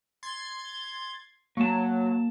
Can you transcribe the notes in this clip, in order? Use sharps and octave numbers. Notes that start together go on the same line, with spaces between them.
C6 G#6 A6
F#3 A#3 A5